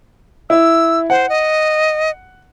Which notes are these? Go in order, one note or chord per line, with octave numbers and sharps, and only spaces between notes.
E4 E6
C5 F#5
D#5